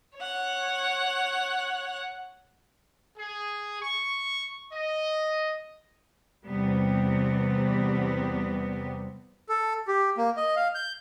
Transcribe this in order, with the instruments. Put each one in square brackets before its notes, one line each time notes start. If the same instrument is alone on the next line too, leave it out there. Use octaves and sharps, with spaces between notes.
[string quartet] C#5 F#5
[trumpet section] G#4
C#6
D#5
[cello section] E2 C3 G3 B3
[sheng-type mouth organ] A4
G4
A#3
D#5
F5
G6